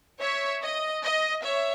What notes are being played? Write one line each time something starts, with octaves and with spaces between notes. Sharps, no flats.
C#5 E5
D#5
D#5
C#5 E5